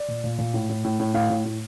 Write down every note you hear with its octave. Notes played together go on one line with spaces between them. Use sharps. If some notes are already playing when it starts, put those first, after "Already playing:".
Already playing: D5
A#2
A#2
A#2
A2
A2
A2
A2
A2 F5
A2
A2